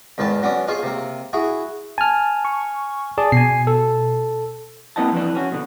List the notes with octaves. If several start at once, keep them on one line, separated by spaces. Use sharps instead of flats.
E2 G#2 D#3 B4 A5
F#3 B3 C#4 D4
D#4 F4 G#4 C5 C#5
C3 A#3
E4 F#4 G#4
G#5 A5 F6
C#6
G#4 D5 A5
B2 G#5 C7
A4
A#3 C4 E4 D#5 F#5 A5
F2 E3 D4
C#4 F#4
B2 D3